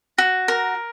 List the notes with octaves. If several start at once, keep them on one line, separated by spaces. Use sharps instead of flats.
F#4
A#4